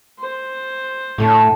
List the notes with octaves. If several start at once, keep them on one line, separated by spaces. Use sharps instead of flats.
C5
A2 D3 A4 C#5